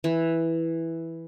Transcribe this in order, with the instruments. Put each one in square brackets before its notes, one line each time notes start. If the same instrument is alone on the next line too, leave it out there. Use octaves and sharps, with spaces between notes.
[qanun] E3